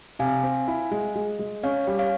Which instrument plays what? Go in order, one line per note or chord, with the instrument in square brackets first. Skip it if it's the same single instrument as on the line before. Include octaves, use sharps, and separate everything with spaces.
[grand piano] C3 [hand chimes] F5 G#5
[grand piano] C4
E4
G#3
G#3
G#3
[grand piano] C#4 [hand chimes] C#5 F5
[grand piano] G3
[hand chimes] C#5 F5